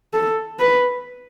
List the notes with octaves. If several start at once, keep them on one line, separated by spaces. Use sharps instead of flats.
A4
B4